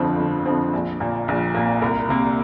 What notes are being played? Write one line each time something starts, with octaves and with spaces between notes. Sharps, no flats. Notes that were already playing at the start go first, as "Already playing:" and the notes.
Already playing: G1 F2 D3 F3 C4
G1
F2 D3 F3 C4
A#1
A#2 A#3
A#1
A#2 A#3
C2 A#4
C3 A#3